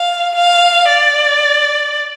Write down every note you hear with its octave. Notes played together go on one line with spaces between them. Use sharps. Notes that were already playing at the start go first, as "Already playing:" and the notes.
Already playing: F5
F5
D5